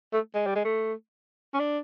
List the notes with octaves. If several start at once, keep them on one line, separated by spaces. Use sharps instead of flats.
A3
G#3
G3
G#3
A3
C#4
D4